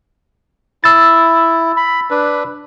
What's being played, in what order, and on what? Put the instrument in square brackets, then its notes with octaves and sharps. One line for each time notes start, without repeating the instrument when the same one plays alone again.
[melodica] E4 [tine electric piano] E6 A6
[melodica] B5
D4 B4